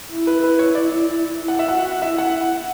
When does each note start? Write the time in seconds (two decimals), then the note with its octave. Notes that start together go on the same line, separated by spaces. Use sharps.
0.11 E4
0.27 B4
0.43 B4
0.59 C#5
0.75 D5
1.38 E4
1.48 F#5
1.59 E5
1.68 F#4 F#5
2.02 E4 E5
2.18 F#5